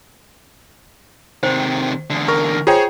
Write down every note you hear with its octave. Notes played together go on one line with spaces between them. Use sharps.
C3 D#3 C5
E2 D3
A#4 C#6
F4 G#4 C5 C#5 G5